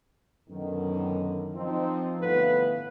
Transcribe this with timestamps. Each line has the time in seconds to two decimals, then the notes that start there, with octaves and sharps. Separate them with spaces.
0.49 F#2 B2 D3 D#3
1.54 F3 C4 D#4
2.20 G1 A2 E3 B3 B4 F5